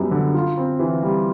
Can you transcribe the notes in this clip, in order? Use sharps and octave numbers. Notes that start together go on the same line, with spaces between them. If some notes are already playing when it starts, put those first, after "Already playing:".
Already playing: F#2 G3 B3
D3
F4
C4
E3
G3